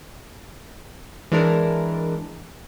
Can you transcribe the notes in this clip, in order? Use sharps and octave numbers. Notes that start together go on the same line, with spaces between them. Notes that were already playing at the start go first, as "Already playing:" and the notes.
E3 G#3 D4 A#4